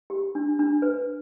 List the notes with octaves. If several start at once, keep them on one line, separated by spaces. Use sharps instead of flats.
G4
D4
D4
B4